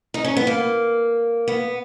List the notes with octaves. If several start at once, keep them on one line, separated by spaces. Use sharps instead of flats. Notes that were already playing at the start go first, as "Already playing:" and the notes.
D#4
C#4
B3
A#3
B3